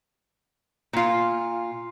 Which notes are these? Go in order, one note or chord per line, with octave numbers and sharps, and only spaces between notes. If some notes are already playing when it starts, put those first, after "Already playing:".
A#2 F4